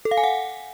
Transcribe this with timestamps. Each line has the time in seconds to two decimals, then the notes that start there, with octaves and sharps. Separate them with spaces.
0.05 A4
0.11 F5
0.17 G#5
0.24 F#5